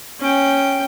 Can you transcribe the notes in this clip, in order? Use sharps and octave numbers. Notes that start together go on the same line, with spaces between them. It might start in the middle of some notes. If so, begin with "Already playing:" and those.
C#4 G5